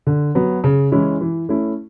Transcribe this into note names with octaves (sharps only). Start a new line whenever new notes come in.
D3
F#3 B3
C#3
E3 G#3 C#4 E4
E3
A3 C#4 E4